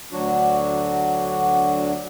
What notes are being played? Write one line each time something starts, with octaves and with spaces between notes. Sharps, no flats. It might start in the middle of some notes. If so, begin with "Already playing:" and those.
D2 F#3 D4 F#4